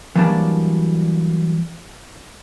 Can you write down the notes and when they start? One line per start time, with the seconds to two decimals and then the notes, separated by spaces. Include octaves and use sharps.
0.16 E3 F#3 G3 A#3 D4 A5